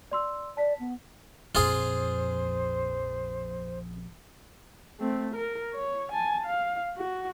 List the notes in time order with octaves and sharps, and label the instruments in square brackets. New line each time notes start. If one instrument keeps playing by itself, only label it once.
[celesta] D5 C6 E6
[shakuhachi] D5 [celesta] A5 B6
[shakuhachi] B3
[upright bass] A#1 F2 [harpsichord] F4 G#4 [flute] C5
[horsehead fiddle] A3 C4
A#4
C#5
G#5 A5
F5
F#4